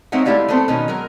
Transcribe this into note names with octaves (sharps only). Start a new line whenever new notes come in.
G#3 C4 D#4 C#5 E5 F#5
G#3 A3 E4 G4 D5 F5
A3 B3 C4 A4 C5
B2 D#3 C#4 D#4
F#3 G#3 A#4